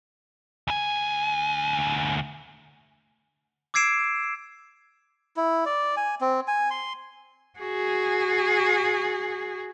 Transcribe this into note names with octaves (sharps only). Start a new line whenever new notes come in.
D2 G#5
D6 E6 G#6 C7 D7 E7
E4
D5
G#5
C4
G#5
C6
F#4 G#4